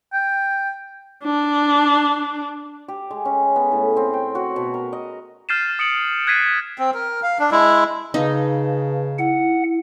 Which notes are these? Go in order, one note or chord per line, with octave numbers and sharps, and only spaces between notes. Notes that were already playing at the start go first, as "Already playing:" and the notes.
G5
D4
G4
G#3
C#4
B3
A2
C4
G5
F#4
B2
A#4
D#5
F6 G6 A6 C7 D#7 E7
D#6 C#7 D7 F#7
F#6 G#6 A6 B6 C7 D#7
C4
A#4
F5
D4
G#3 E4
C#3 D#4 B4 F5 A5
E4 F#5